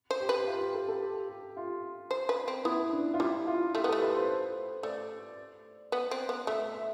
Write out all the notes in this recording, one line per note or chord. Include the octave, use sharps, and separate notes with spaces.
C5
G4
B4
F4
G4
A4
A4
G4
G4
F4
C5
B4
C4
B3 E4
D4
F4
G3 E4
F4
A3 G4
B3
A4
A3
B4
C5
A3 D5
B3
C4
B3
A3 E5
E5